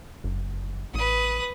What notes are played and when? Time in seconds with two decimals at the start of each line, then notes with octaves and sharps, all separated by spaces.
0.24 F#1
0.94 A1 B4 D#6